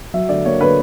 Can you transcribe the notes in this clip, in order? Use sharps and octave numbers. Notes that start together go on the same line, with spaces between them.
F#3 E5
D3 D5
A#3 C#5
D3 B4